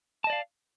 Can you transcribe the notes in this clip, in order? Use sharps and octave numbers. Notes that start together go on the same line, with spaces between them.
D5 D#5 F5 A5